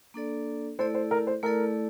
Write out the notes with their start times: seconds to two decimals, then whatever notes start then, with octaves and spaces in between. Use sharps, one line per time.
0.14 A#3 D4 A4 D5
0.79 A3 E4 A4 C5 D5
0.94 C5
1.11 A#4
1.27 C5
1.43 A3 E4 A4 A#4 D5